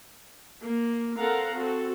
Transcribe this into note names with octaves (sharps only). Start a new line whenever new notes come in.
A#3
C4 A4 A#4 F5 F#5 A#5
C4 F#4 A4